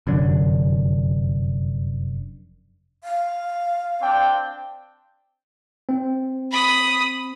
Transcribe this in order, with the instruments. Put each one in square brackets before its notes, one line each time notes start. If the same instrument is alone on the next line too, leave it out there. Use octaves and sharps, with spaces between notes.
[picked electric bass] F1 F#2 D3
[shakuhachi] F5
[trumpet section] C4 D4 G5
[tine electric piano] C4
[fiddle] B5 D#6